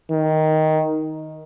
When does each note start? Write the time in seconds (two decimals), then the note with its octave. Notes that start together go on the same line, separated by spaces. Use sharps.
0.12 D#3